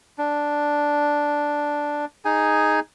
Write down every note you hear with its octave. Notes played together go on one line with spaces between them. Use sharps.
D4
D#4 G#4 G#5